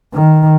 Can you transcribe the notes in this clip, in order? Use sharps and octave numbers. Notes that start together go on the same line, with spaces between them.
D#3